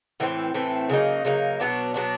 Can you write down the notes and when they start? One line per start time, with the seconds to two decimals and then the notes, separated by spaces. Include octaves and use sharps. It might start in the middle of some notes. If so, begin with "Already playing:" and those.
0.20 A2 E3 A3 C4
0.54 A2 E3 A3 C4
0.89 C#3 F#3 A#3 D#4
1.24 C#3 F#3 A#3 D#4
1.60 B2 F#3 B3 D4
1.94 B2 F#3 B3 D4